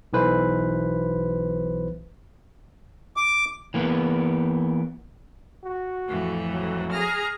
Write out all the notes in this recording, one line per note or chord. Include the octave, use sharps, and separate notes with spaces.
B1 E3 B4 C5
D6
E3 A#3 B3
F#4
F2 A2 E3
F#3
G#4 A#5 F6